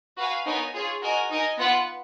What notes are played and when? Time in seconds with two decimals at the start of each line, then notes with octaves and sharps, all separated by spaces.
0.17 F#4 B4 F5 G#5
0.46 B3 D#4 A#4 C#5 G#5
0.74 F4 G#4 C#5
1.02 F#4 A#4 D#5 G#5
1.30 D#4 A#4 D#5 G#5
1.58 B3 F4 B4 F#5